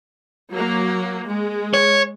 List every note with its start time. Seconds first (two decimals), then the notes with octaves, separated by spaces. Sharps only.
0.50 F#3 A#3
1.25 G#3
1.74 C#5